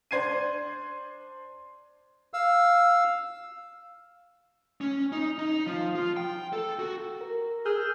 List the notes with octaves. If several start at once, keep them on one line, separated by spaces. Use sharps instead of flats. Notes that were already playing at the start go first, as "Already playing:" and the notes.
D4 C5 G#6 C7 D#7
F5 E6
C#4
D#4
D#4
F3
F4
G5
A4
F#4
A#4
G#4 E6 F6 G6